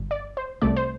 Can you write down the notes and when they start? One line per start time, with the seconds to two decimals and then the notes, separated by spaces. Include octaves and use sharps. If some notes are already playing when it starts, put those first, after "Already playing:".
Already playing: G1 G2
0.11 D5
0.37 C5
0.61 C2 C3 A3 D5
0.76 C5